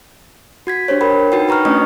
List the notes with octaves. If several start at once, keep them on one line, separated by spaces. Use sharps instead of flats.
F#4 G#6 B6
D4 G4 C5 C#5
A#4 G5 B5
D#4 F#4 B4 G5
F#4 B4 A#5 C#6 F6
A3 C#4 D4 D#5 C#6